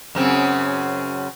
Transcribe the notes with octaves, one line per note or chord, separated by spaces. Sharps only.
F#2 C#3 C4